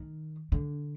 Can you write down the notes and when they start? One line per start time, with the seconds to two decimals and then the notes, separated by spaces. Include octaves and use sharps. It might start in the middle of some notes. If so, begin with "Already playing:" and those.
Already playing: D#3
0.52 D3